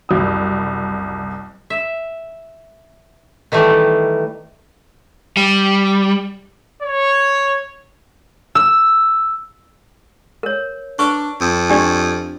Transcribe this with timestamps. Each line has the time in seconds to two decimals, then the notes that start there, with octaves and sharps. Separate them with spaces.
0.09 F#1 C2 D#6
1.70 E5
3.52 D#3 E3 G3 A3
5.37 G3
6.82 C#5
8.55 E6
10.43 A#4 C#5
10.99 D4 B4 C#6
11.41 F2
11.70 D4 G4 D5